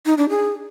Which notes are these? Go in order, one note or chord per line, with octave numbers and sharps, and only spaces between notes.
D#4
D4
G#4